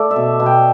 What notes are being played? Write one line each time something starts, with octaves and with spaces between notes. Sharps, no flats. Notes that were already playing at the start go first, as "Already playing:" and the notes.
Already playing: A3 A4 D5
E5
B2
B2
G5